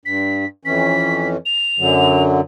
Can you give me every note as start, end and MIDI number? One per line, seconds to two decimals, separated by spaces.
0.05 0.45 43
0.05 0.47 95
0.65 1.37 41
0.65 1.37 52
0.65 1.37 61
0.65 1.28 95
1.46 2.22 101
1.79 2.41 42
1.79 2.41 50
1.79 2.41 54